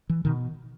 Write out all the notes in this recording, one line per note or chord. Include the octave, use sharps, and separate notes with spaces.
E3
B2 D#3